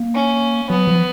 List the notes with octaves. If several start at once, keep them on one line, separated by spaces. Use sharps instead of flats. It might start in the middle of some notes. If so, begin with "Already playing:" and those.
Already playing: A#3
C#4
F#3 B3
F3